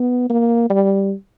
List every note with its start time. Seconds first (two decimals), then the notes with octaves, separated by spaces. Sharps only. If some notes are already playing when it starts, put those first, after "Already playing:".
Already playing: B3
0.30 A#3
0.70 G3